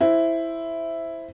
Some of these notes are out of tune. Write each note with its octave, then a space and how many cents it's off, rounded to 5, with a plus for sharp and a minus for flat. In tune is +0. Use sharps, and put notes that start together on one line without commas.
E4 +0 C5 +0